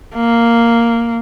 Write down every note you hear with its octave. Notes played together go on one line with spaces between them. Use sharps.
A#3